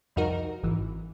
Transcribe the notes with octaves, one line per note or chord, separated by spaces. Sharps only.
C2 F2 D#4 F#4 A#4
G#1 E3